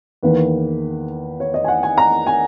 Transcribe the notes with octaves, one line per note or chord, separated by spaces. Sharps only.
E2 D#3 A#3 B4
C#5
D#5
G#5
F#5
G#5
A#5
G#5